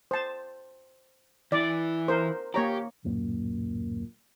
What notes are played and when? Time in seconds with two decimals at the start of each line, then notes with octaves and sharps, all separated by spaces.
0.11 C5 A5
1.52 E3 E4 D5
2.08 A#4 C5
2.54 A#3 G4 C#5 A#5
3.04 D1 F#2 A#2 A#3